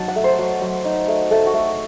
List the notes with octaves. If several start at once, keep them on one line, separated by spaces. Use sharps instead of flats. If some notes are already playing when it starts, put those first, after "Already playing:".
Already playing: F#3 D#4 A5
F#5
A3
C5
F#3
F#3
D#4
A3
A3 A4
F#4
A3